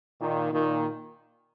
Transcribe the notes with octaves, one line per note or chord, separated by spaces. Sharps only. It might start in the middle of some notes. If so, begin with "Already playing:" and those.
A#2 D#3
A#2 D#3